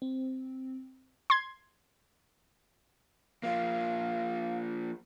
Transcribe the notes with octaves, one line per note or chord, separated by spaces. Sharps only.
C4
C6 G#6
F3 A#3 F5